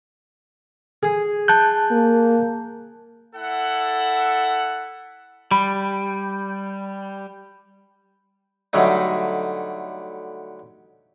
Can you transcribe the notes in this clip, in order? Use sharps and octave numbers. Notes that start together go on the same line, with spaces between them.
G#4
A5 F#6 G6
A#3
E4 A4 F#5
G3 B5
D3 F#3 G3 A3 D#4